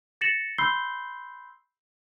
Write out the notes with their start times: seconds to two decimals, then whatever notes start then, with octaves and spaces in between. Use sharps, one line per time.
0.21 A6 A#6 C#7 E7 F#7
0.58 B5 C6 E6 G6 C7 G7